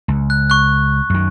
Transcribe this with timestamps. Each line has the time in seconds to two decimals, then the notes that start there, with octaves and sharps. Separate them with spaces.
0.08 C#2
0.30 F#6
0.50 C#6 F#6
1.10 F#2 D#3